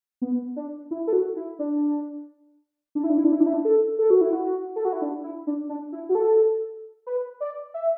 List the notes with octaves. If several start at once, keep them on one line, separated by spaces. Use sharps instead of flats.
B3
D4
E4
A4
F#4
E4
D4
D4
E4
D4
E4
D4
E4
D4
E4
D4
A4
A4
F#4
E4
F#4
A4
F#4
E4
D4
E4
D4
D4
E4
F#4
A4
B4
D5
E5